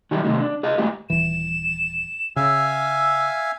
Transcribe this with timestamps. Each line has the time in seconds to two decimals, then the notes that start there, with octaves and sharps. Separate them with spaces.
0.11 D#3 F#3 G3 E4 G4
0.25 C3 D#3 G#3 A3
0.40 D4
0.63 G#4 D#5 F5
0.78 G#3 A3 E4 G4
1.10 D#1 E3 E7
2.36 C#3 E5 F5 G#5 E6